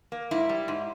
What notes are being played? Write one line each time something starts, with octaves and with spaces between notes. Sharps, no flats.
A#3
G#2 E4
G3
G#2